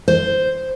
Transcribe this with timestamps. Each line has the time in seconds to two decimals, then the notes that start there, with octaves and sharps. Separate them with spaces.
0.08 C5